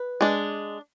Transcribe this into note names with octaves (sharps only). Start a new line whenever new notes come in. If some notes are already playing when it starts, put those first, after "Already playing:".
Already playing: B4
G#3 D4